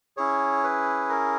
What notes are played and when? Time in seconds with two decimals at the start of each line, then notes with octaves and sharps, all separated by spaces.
0.17 C#4 E4 G#4 C#5
0.64 B4
1.09 A#4